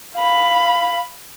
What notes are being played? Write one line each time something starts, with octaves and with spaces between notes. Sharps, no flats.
F5 B5